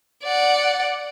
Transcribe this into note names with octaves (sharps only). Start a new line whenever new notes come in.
D5 F#5